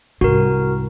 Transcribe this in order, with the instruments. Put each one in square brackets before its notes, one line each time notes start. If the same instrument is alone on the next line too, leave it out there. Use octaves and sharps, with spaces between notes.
[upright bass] C2 G#2 [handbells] F#4 A#4